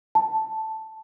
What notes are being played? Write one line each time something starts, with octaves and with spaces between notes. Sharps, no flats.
A5